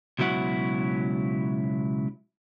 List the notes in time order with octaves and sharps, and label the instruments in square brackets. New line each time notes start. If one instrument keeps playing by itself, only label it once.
[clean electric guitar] C#2 B2 F#3 E4 F#5